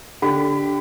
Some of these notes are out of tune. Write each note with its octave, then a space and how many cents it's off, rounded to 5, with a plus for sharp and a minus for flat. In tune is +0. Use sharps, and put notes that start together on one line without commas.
D3 -10 G4 +0 B5 +35